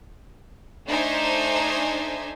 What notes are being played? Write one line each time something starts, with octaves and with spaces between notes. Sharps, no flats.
A3 D4 D#4 C5 E5 G#5